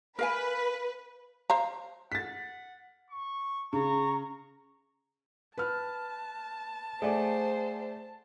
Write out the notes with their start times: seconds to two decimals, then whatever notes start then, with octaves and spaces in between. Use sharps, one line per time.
0.19 A#4 B4 F5 G#5
1.50 C5 F5 A#5
2.12 F#5 A6 B6
3.10 C#6
3.73 C#3 A#5 C#6
5.58 B4 A5 F6
7.02 A3 G#4 C5 D5 F#5 G#5